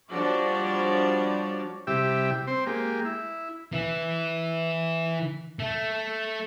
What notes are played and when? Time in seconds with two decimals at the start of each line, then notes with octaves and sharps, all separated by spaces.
0.11 F3 G3 D4 F#4 C#5 D5
1.87 C3 G3 E4 G4 E5
2.47 C4 C5
2.66 G#3 A#3 G4
3.05 E4
3.73 E3
5.59 A3